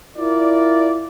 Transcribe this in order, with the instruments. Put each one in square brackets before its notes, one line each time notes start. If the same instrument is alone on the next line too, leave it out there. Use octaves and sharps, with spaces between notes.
[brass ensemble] E4 F4 A#4 D5